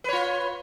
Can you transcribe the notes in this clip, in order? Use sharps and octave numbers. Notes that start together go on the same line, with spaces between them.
F4 B4 C#5